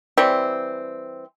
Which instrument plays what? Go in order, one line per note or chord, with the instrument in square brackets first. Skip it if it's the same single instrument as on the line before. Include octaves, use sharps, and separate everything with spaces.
[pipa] E3 G3 C4